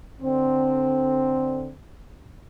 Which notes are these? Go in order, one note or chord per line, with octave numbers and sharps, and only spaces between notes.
D3 C4